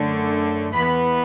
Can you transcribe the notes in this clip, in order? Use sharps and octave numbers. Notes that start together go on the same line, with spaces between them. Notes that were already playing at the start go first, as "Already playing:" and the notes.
Already playing: F#2 D3 A3
E2 E3 B3 B5